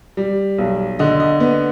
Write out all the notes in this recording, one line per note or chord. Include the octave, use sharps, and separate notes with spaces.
G3
B1
D3 D#5
D#5
B3 D#5